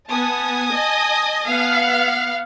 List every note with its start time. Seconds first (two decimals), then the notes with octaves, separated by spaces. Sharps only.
0.10 B3 G#5 A5 D#6
0.72 D#5
1.47 B3 F5 F#5